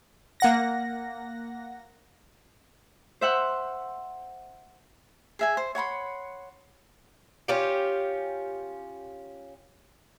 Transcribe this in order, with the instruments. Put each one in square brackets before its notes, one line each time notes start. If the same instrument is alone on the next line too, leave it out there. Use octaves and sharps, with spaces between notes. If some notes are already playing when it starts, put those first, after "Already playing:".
[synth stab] A#3 F#5 A#6
[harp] C5 E5 F#5
[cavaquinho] G#4 E5 G#5
C5
C#5 F#5 B5 C6
[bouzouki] C#4 F4 G4